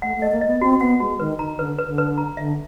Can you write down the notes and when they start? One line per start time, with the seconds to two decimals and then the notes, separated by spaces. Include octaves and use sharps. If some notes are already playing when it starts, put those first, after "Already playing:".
0.02 A3 F#5
0.17 A3
0.22 D#5
0.32 A#3
0.41 D#5
0.47 B3
0.61 C4 F#4
0.81 B3 F#5
1.00 G#3 F#4
1.20 D#3 B4
1.39 D#3 A#5
1.59 D3 B4
1.79 B4
1.86 D3
1.98 B4
2.18 A#5
2.37 D3 E5